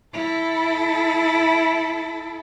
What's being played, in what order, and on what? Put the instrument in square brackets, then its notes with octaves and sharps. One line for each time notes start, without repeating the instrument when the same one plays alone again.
[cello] E4 A4